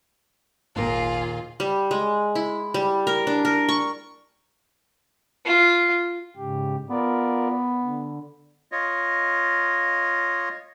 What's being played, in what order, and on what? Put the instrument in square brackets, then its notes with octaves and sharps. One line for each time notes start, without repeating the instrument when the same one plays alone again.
[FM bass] G#1 [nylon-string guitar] D#2 A#2 A#4 [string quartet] F4 G#4
[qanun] G3
G#3
E4
G3
A#4
D4
A#4
C#6
[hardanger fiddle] F4
[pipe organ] G#2 C#3 G4
[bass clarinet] B3 [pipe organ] F4 A#4 D5
[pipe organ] D3
[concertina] F4 C#5 D#5